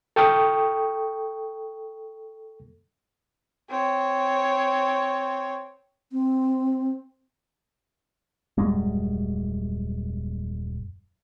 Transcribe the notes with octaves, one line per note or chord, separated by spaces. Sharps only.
A4 G5 C#6 D#6 F6
C4 C#5
C4
D#1 F#2 G3 G#3